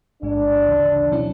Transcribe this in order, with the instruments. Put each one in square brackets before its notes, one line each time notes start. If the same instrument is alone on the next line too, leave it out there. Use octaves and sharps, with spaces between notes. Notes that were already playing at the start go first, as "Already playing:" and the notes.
[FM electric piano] A1 G#2 G#3 [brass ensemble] D4
[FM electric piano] D2 C#3 E3
B2 F#3 C#4 E4